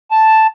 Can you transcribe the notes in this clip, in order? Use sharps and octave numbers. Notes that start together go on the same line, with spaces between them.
A5